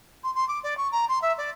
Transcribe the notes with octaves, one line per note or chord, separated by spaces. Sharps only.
C6
C6
D6
D5
C#6
A#5
C6
E5
D5